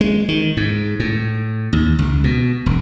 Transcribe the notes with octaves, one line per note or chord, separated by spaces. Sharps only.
G#3
D#3
G#2
A2
D#2
C#2
B2
E1